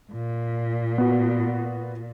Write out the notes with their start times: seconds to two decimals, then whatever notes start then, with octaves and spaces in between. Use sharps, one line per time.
0.13 A#2
0.98 B3 F#4